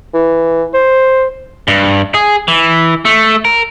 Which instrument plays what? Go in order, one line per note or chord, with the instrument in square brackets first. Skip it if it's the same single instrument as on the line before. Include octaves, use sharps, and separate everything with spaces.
[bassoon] E3
C5
[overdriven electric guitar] G2
G#4
E3
A3
A#4